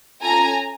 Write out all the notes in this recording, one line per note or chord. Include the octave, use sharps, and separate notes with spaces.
C#4 F4 A4 G#5 A#5